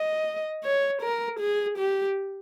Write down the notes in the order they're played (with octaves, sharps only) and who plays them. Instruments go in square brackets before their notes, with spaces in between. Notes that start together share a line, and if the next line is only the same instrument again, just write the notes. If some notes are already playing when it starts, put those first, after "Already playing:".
Already playing: [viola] D#5
C#5
A#4
G#4
G4